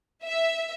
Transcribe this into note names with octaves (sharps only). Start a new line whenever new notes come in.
E5